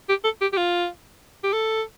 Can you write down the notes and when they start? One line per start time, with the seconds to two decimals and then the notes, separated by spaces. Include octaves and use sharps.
0.09 G4
0.24 A4
0.41 G4
0.53 G4
0.57 F4
1.44 G4
1.53 A4